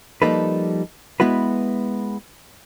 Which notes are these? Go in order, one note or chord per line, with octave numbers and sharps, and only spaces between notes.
F3 G3 A#3 D#4 A4 B4
G#3 B3 E4 F#4 B4